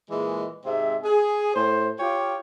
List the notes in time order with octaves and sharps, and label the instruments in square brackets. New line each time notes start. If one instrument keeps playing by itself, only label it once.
[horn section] A#2 E3 G#3
G#2 C3 G#3 C4 E5
G#4
A2 C5
F4 G4 C#5 F5 G5